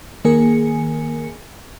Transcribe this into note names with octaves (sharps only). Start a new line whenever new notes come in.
D#3 A#3 G#4 A#4 G#5 C#7